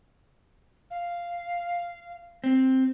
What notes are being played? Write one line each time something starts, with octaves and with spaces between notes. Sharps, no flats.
F5
C4